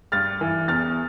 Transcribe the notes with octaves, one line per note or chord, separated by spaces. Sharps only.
G2 F6 A6
E3
E2 F6 A6